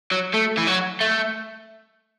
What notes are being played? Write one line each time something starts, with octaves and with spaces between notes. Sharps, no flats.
F#3
A3
E3
F#3
A3